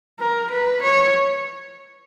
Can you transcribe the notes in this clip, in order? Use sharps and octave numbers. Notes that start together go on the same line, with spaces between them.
A#4
B4
C#5